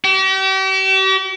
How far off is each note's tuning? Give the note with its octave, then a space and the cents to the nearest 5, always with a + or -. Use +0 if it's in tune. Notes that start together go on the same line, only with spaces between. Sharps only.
G4 -40